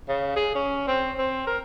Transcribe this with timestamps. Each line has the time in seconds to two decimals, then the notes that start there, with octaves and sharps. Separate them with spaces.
0.08 C#3
0.36 G#4
0.55 C#4
0.87 C4
1.18 C4
1.47 A#4